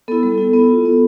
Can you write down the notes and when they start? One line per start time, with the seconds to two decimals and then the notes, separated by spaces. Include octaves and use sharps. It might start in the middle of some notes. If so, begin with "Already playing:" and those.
0.08 B3 E4 A4
0.23 G3 A4
0.38 B3 E4
0.53 B3
0.70 F4
0.85 B3